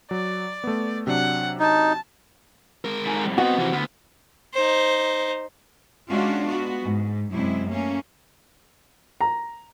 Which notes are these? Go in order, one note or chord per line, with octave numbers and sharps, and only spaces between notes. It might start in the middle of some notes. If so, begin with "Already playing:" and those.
F#3 D5
A3 B3
C3 F#3 D4 F#5
D#4 A5
G#3 A#4
A3 D#4 G#5
F2 A2 G3
B3 C4 F#4 D#5
C3 E3 F3
D2 B3
D#4 C5
G#3 C#4 D4 F4 F#4
B3 F#4
G#2
F#2 C3 G#3 E4
A3 A#3 C#4
A#5